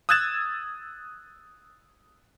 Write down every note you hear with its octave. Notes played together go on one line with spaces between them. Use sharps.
D#6 E6 F#6 G#6 A6 E7